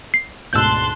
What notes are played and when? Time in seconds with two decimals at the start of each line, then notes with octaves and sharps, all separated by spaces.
0.14 C7
0.53 D2 G#2 B2 A5 C6 E6 F#6 G6